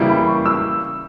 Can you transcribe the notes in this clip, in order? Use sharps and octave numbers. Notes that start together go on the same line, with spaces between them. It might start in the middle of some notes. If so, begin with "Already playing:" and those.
Already playing: C#3 E3 G3 A#3 E4
B5
C#6
E6